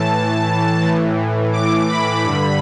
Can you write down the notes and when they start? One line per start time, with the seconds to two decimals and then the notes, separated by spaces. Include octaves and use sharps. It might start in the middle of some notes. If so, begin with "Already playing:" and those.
Already playing: A2 E3 A5
0.81 A2 E3
1.53 D6
1.89 B5
2.24 G2 D3